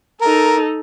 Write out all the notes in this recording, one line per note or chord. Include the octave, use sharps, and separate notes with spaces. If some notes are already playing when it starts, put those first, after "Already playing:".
D#4 A4 A#4